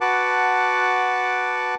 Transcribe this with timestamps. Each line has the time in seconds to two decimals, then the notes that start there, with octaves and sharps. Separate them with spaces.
0.01 F#4 B4 F#5 A5 D6